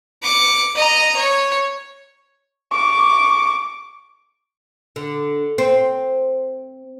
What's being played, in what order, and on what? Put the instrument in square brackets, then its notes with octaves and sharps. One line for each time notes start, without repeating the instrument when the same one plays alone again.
[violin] D6 C#7
D#5 A#5
C#5
[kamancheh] C#6 D6
[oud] D3
C4